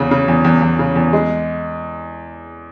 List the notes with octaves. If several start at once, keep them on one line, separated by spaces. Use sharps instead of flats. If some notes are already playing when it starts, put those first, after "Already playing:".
Already playing: E2 C#3
C#3
E2
E2
E2
C#3
E2
G#3